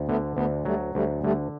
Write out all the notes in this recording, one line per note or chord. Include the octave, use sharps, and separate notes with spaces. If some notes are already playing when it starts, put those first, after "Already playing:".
Already playing: D2
D3 A3 B3
D2 A3 B3
F#3 G3 A3
D2 G3 A3
D3 G3 A3